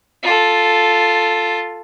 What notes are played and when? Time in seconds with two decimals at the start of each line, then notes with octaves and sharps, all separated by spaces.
0.23 F4 A4